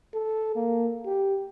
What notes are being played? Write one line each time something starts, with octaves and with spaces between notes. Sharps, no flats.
A4
A#3
G4